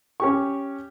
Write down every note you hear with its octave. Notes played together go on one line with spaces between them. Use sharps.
C#4 G4 C#6